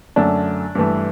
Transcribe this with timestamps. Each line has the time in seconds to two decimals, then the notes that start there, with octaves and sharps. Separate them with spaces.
0.16 F#2 D3 A3 D4
0.75 G2 E3 A3